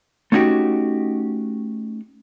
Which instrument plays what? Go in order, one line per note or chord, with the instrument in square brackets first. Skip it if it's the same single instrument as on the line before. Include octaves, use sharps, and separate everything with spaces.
[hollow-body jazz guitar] A3 C#4 D#4 F#4 G4